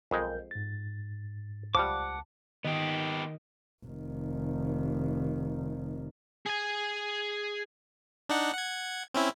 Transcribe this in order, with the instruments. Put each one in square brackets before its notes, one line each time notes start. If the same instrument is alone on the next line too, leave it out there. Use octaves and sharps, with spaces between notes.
[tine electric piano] B1 A#4 G6 [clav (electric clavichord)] F2 G#3
[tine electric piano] G#2 A6
[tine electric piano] C#2 A5 [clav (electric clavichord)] F3 G3 [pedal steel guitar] F#5 D6
[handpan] D#3 D#5 [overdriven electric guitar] B3 G4
[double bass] F1 D#3
[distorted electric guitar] G#4 G#5
[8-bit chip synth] D4 D#4 F#5
F#5 G#6
C4 C#4 E4